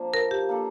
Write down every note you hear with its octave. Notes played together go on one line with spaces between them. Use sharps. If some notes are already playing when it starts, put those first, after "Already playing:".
Already playing: F3 A#3 D4
A#4
G4
A#3 D4 A4